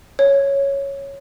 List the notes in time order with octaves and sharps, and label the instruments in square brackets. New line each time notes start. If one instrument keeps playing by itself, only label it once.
[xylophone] C#5